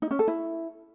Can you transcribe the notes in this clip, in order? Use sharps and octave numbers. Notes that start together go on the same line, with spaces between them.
D#4
C#4
A4
E4